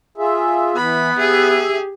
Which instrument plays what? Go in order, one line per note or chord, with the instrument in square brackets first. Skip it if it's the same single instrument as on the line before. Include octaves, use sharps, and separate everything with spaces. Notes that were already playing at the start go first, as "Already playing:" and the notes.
[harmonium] F4 G#4 E5
[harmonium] E3 [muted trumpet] B3 [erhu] B5
[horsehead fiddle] G4 [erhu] G#4 [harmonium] E5